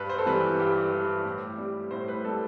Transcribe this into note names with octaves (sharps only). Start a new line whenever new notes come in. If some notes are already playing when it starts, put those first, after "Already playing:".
Already playing: G2 B4
C5
A4
E3 G3 B4
G2 G4
E3 G3
A2
G3
A2 C5
B4
G3 A4